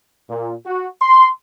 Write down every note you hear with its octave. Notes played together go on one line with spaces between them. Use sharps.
A#2
F#4
C6